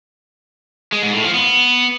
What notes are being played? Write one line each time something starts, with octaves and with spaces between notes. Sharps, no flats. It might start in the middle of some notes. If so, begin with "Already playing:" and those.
G#3
G#2
A2
F3
B3